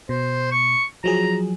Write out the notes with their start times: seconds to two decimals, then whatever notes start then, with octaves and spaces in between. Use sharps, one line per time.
0.09 B2 C5
0.52 C#6
1.04 F3 F#3 G#4 A#5